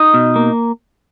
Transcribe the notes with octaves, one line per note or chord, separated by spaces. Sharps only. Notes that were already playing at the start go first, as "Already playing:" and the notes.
Already playing: D#4 D#5
B2
A#3